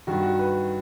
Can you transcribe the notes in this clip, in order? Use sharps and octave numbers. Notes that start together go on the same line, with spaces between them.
G2 D#3 F#4
F#4
B4